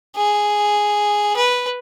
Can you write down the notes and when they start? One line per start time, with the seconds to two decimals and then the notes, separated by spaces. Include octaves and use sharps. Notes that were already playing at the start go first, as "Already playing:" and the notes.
0.16 G#4
1.36 B4